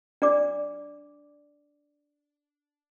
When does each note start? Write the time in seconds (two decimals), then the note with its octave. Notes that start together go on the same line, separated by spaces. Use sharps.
0.22 D4 D5 D6